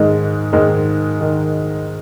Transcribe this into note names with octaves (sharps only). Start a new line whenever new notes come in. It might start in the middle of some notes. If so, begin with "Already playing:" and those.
Already playing: G#2 D#3 G#3
G#2 D#3 G#3
D#3